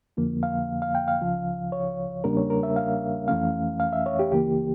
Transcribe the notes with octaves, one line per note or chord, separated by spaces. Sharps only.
F2 D3 F3 A#3
F5
F5
G5
F5
C#2 C#3 F3
C#5
E2 C#3 G3 A#3 D4 A#4
C#5
A#4
E5
F5
F2 E3 A3 C#4 F5
F5
E5
C#5
G4
C#2 C#3 E3 A#3 G4